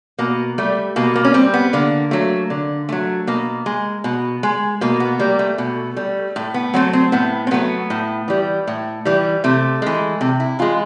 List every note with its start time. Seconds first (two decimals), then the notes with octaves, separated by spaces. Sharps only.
0.18 B2 A#3
0.58 G3 A3
0.96 B2 A#3
1.16 A#3
1.25 C#4
1.34 G3 C4
1.54 B3
1.73 D3 A#3
2.11 F#3 A3
2.50 D3
2.89 F#3 A3
3.27 B2 A#3
3.66 G#3
4.04 B2
4.43 G#3
4.81 B2 A#3
5.00 B3
5.19 G3 A#3
5.39 A3
5.58 B2
5.97 G3
6.36 A2
6.54 B3
6.74 F#3 A3 C4
6.93 C4
7.12 A2 B3
7.47 C4
7.51 F#3 A3 B3
7.90 A2
8.28 E3 G3
8.67 A2
9.05 E3 G3
9.44 C3 A3
9.82 E3 G#3
10.21 C3
10.40 E4
10.59 E3 G#3 F4